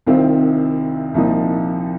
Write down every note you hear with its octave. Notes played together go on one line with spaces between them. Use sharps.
C2 C3 D#3 C4 F4
C2 A#2 F3 D#4